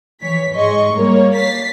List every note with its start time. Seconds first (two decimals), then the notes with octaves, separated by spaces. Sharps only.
0.21 E3 C#5 B6
0.54 G#2 G#4 D#5 C6 C#6
0.94 G3 A#3 A#4 C#5
1.34 A6 B6 C7